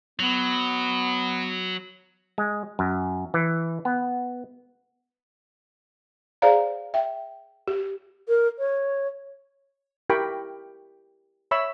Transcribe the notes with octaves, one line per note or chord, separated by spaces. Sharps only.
F#3 B3
G#3
F#2
E3
B3
G#4 C5 D5 F5 A#5
E5 G5
G4
A#4
C#5
E4 G4 A#4 G5 B5 C#6
C#5 E5 B5 C#6 E6